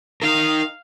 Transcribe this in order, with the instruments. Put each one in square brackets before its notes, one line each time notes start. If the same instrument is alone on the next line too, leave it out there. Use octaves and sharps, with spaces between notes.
[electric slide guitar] D#4 A#4 [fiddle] F5